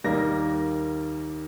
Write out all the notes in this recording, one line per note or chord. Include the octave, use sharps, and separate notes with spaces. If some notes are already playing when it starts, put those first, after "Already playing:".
D#2 D#3 G3 A#3 A#6